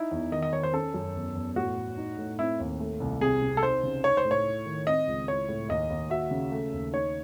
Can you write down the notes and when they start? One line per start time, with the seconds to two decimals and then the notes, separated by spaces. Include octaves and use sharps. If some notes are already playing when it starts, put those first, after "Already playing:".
Already playing: D#4 E4
0.11 E2
0.32 D#3 D#5
0.42 D#5
0.52 D#3 C#5
0.63 C5
0.73 C#4 A4
0.94 F#2
1.15 E2
1.35 E2
1.56 A2 F#4
1.77 A2
1.97 D#4
2.18 A2
2.39 C4 E4
2.60 D#2
2.80 A3
3.00 C2
3.21 C3 G#4
3.42 C3
3.57 A4
3.63 D#4 C5
3.83 C#3
4.04 D#4 C#5
4.17 C5
4.25 A2
4.31 C#5
4.45 E4
4.66 D#3
4.87 C4 D#5
5.07 C#2
5.28 E4 C#5
5.49 A2
5.69 D#2 D#5
5.90 D#2
6.10 F#4 E5
6.31 C#3
6.52 A3
6.73 D#2
6.93 D#4 C#5